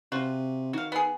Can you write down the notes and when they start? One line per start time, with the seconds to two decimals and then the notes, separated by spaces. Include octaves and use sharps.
0.12 C3 F4 F#4
0.73 D#3 F#4 F5
0.92 B3 G#4